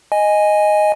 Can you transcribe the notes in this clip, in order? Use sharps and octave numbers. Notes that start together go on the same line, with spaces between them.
D#5 G#5